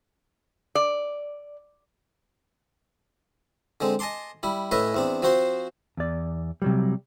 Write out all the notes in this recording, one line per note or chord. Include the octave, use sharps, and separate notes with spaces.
D5
D3 G#3 C4
D#5 G#5 A5 C6 D6
G3 E4
A2 C#4 B4 D#5 E5 G#5
E2 C4 D4
F3 C4 F#4 C5 C6
E2 D5
C3 F#3 G3